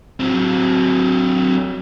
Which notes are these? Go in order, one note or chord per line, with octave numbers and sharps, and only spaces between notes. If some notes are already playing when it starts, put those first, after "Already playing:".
F#3 C4